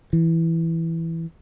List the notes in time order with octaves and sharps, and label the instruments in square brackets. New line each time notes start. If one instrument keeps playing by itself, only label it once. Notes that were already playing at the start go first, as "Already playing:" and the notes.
[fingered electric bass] E3